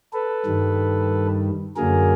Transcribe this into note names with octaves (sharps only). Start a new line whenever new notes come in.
A4 B4
G2 D#3 G3
F#2 D3 F#3 A#3 G#4 A#4